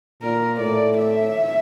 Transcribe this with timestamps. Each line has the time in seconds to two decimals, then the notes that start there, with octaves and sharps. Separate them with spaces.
0.22 A#2 A#4
0.60 A2 D5
0.97 E5